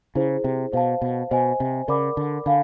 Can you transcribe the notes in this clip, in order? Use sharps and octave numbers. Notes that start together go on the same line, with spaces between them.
C#3 E4 G#4 C5
C3
B2 C5 F5 A5
B2
B2 C5 D#5 G#5
C3
C#3 A#4 D5 F#5 B5 D6
D3
D3 F5 G#5 B5